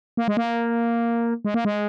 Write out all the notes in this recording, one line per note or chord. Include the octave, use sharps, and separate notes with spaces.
A#3
G#3
A#3
G#3
A#3
G#3